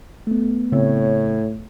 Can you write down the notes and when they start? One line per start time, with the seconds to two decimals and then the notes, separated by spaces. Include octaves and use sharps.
0.27 A3 B3
0.72 A2 C#3 C4 C#5